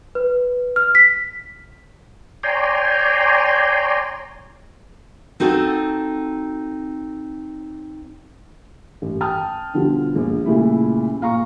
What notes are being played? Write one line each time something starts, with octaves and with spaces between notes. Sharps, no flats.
B4
F6
B6
C#5 D5 G5 G#5 A#5 C6
C4 D#4 F#4 A4
A1
G5 A5 D#6 F6
B2 D3 F3 G3
A#1
A#2 C#3 G3 A3 E4
A#2 F5 A#5 C#6